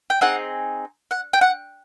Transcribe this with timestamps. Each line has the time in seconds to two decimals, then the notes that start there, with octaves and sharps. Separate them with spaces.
0.10 G5
0.21 C4 D#4 G#4 F#5
1.11 F#5
1.33 G5
1.41 F#5